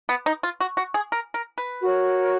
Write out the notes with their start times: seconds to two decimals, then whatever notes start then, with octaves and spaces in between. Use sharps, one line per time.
0.09 B3
0.26 D#4
0.43 F4
0.60 F#4
0.77 F#4
0.94 G#4
1.12 A#4
1.34 A#4
1.58 B4
1.80 F#4 A#4 C#5